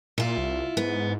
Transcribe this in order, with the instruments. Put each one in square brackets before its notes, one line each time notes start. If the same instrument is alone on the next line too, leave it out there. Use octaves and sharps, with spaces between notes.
[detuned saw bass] A#2 [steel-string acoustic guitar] E4 F4
[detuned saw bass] C2
[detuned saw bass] G#2 [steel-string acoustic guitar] B3